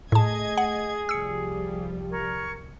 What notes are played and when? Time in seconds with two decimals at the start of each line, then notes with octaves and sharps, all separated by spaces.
0.12 A2 A3 G#4 D#5 A5 G#6
0.58 F#5
1.09 C2 F3 G3 E6 C#7
2.11 A#4 C#6 G#6